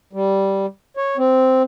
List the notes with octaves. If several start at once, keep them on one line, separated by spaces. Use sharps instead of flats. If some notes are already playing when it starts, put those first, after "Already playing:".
G3
C#5
C4